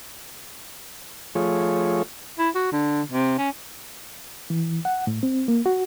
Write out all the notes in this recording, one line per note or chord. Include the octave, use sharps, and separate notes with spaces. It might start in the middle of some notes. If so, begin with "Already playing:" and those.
F3 A3 F4 G#4 C#5
E4
F#4
D3
C3
C#4
E3
F#5
A2
C4
A#3
F#4